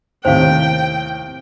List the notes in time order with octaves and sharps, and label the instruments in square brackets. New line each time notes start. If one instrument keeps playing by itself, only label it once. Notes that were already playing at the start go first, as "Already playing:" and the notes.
[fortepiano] D#2 A2 C3 [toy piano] C5 F5 [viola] G5